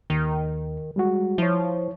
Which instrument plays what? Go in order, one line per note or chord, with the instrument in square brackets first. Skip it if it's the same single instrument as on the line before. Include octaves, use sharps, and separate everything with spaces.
[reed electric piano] D#2 [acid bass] D#3
[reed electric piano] G3 G#3 F#4
[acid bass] F3 [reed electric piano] E4 C#5